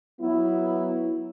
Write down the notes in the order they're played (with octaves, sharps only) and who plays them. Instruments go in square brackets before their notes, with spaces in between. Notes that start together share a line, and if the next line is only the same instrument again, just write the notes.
[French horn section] F#3 B3 E4